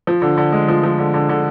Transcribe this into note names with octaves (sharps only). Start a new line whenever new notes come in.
F3
D3
D3
G#3
F3
F3
D3
D3
D3